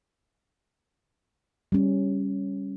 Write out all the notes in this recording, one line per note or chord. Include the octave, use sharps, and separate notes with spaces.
G3 C#4